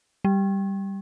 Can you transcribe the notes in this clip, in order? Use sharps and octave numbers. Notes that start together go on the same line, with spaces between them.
G3